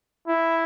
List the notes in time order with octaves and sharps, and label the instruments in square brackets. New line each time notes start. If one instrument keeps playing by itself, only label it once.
[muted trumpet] E4